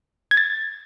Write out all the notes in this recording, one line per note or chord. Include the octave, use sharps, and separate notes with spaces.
G#6
A6